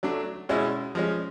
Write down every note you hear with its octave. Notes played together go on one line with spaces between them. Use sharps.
F#3 A3 D4
B2 G#3 C#4 E4
F3 G#3 C#4